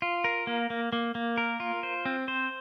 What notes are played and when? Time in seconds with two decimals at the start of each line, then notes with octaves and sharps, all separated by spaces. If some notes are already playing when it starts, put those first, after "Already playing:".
0.02 F4
0.24 A#4
0.47 A#3
0.70 A#3
0.93 A#3
1.15 A#3
1.38 A#4
1.60 F4
1.83 C5
2.05 C4
2.28 C5